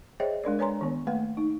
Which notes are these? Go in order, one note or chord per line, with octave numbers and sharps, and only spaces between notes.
G#4 C5 C#5 D#5 E5 G5
G#3 D4 A#4 D5
B4 C#5 G#5 A#5 C6
D#3 B3
A3 A#3 B4 F5
D#4